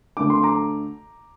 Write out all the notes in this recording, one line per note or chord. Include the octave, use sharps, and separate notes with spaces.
D2 D3 A3 D4 D6
C6
A#5 D6